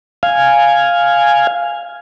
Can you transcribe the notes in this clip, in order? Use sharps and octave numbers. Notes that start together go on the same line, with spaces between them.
F5 G#5